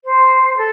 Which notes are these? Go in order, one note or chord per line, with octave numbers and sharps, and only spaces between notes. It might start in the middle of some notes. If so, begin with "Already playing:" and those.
C5
A4